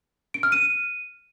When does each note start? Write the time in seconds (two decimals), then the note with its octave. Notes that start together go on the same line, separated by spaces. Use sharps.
0.34 D7
0.43 F6
0.52 D#7